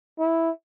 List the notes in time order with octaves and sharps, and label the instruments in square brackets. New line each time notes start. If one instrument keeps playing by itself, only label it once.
[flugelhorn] E4